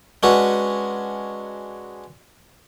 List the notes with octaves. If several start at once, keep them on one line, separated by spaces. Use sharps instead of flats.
G#3 C#4 D4 F#4 B4